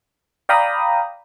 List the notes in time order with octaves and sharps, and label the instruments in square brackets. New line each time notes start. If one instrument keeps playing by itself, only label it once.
[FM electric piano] D5 F5 G5 A#5 B5 D#6